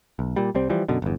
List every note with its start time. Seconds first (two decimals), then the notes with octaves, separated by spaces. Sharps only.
0.19 B1
0.36 A#2 G3
0.55 C2 G3 C4
0.70 E3 F3 G3
0.88 F#2 B2 D3
1.02 G1 E2